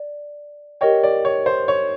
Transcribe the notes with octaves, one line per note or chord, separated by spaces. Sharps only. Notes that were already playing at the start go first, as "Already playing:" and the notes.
Already playing: D5
G4 A#4 C#5 D#5 G5
D5
C#5
C5
C#5